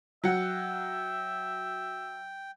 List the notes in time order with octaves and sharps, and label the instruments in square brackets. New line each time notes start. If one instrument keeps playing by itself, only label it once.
[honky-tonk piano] F#3 F#5 [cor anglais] E5 [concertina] G5